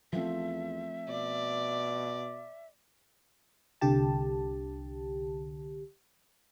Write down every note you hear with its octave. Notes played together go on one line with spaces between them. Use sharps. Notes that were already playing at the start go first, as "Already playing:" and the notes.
E2 F3 A3 C4 E5
B2 D5
C2 D3 G4 A5